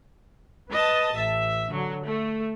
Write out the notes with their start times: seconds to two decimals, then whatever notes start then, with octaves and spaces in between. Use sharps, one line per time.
0.70 B4 D#5 A5
1.15 A1 E5
1.71 D3 F#3
2.05 A3